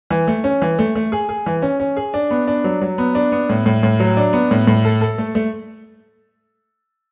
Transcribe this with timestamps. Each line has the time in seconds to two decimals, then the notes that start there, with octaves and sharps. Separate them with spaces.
0.10 E3
0.28 A3
0.44 C#4
0.62 E3
0.79 A3
0.95 A3
1.12 G#4
1.29 G#4
1.46 E3
1.62 C#4
1.80 C#4
1.97 G#4
2.14 D4
2.31 B3
2.48 D4
2.64 F#3
2.81 F#3
2.98 B3
3.15 D4
3.32 B3
3.49 A2
3.66 A2
3.83 A2
4.00 F#3
4.17 D4
4.33 B3
4.51 A2
4.67 A2
4.85 A4
5.01 A4
5.18 A3
5.35 A3